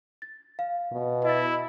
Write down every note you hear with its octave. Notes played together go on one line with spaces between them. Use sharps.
A6
F5
B2
E4 D#5 A6